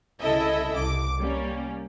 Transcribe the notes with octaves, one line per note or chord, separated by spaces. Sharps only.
C2 C#3 E4 A4 D#5 E5
C2 D6
G3 A#3 C#4